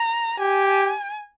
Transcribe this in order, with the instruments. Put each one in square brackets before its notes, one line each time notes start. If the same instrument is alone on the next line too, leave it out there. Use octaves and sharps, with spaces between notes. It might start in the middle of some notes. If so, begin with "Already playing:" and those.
Already playing: [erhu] A#5
[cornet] G4 [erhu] G#5